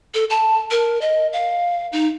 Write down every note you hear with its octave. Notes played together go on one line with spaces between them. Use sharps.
A4
A5
A#4
D#5
F5
D#4